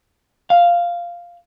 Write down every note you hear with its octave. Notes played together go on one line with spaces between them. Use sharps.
F5